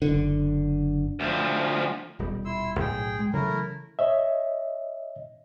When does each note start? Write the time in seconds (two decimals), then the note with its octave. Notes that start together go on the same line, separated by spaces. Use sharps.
0.02 F#1 D3
1.20 D2 F3
2.19 D#1 B2 G3
2.45 E4 C6 E6
2.80 B1 A2 G#4 G5
3.19 G#3
3.33 C#3 E3 F#3 A3 E4 A#4
3.99 C#5 D#5 E5